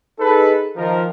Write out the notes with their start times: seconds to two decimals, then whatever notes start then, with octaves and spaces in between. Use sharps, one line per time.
0.20 D#4 G#4 A4 B4
0.76 D#3 F3 A#4